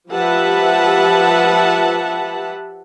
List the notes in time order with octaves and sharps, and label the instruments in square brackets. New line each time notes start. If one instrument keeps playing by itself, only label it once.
[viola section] F3 G4 B4 E5 F#5 A5